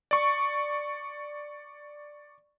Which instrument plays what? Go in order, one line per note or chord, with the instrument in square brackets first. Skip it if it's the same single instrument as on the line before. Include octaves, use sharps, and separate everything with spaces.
[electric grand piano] D5 C#6